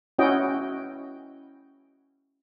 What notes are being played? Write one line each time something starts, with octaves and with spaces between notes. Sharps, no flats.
C#4 E4 F#4 D#5 G5